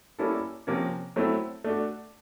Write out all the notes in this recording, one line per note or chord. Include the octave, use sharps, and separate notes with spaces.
G3 A#3 C#4 E4 A4
C3 F3 A#3 C#4
F#3 A3 C4 E4
A3 D4 F#4